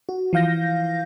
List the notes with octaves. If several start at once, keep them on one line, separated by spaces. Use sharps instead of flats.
F#4
E3 F3 F5 G6 A#6